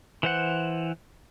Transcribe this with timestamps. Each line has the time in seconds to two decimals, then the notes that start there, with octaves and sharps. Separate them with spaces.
0.23 E3 C5 F#5